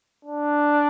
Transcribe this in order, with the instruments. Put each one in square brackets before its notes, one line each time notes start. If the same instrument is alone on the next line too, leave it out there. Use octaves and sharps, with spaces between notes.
[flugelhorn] D4